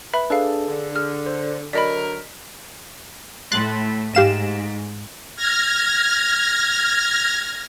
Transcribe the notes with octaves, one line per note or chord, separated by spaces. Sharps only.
B4 E5 B5
D4 G#4 A4 B4 F5
D3
G#4 F6
C5
D3 F#3 A#4 D5 D#5 B5 B6
A2 A3 C6 F#6 A6
G#2 G4 F5 E7
F6 G#6 A#6